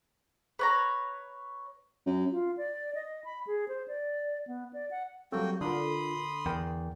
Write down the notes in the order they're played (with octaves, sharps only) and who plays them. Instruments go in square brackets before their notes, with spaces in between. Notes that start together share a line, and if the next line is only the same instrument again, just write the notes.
[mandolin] B4 C#5 A#5
[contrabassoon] F#2
[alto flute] F4
D5
D#5
B5
G#4
C5
D5
B3
D5
F#5
[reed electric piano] F#3 G3 C4 [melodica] A#3 F#4 G5 [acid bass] A4
[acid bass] D3 [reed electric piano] D4 F4 A#4 [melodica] B5 C6 D#6
[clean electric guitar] E2 [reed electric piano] A#4 G5